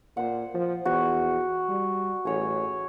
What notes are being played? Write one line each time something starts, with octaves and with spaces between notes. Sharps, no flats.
A#2 C5 F#5
F3
E2 F#4
G3
A1 G#4 C#5